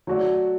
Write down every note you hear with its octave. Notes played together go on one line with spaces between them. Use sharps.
F#3 A3 F#4 D5